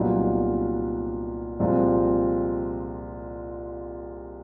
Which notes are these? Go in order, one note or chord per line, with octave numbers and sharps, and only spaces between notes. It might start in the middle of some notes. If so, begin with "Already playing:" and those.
Already playing: C2 A#2 F#3 B3 D#4
C2 A#2 F3 G#3 C4